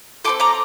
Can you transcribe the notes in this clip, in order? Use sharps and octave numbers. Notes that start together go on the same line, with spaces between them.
C4 F4 A4 D6
A#5 D6